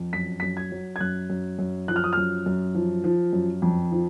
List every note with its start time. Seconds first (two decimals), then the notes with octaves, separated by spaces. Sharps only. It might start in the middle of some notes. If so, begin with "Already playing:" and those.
Already playing: F2
0.13 F#2 B6
0.40 F#2 B6
0.57 G#6
0.72 F#3
0.96 G#6
1.00 F#2 F#6
1.30 F#2
1.59 F#2
1.88 F3 F#6
1.96 F6
2.04 D#6
2.13 F#2 F6
2.46 F#2
2.75 F3
3.04 F3
3.33 F#2
3.62 F2
3.92 F3